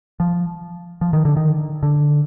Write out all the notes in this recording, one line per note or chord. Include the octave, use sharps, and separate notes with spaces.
F3
F3
D#3
D3
D#3
D3